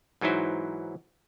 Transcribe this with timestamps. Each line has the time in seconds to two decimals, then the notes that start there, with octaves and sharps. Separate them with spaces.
0.21 G#2 E3 F#3 D#4 E4 C5